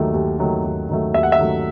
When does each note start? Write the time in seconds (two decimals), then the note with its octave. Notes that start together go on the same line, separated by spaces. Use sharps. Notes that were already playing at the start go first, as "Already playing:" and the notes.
Already playing: D#2 D#3 F#3 A3
0.14 D#2
0.39 D#3 F#3 A3
0.64 D#2
0.89 D#3 F#3 A3
1.14 D#2 E5
1.23 F#5
1.32 E5
1.39 D#3 F#3 A3